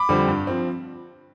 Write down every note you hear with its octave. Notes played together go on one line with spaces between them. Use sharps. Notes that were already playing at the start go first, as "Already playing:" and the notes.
Already playing: B5 D6
F2 D3 G3 C4
G2
F3 C4